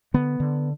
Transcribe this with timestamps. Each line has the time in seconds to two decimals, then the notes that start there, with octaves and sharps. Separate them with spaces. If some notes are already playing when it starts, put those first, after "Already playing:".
0.14 D3 B3
0.40 D3